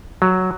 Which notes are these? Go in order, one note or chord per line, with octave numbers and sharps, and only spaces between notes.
F#3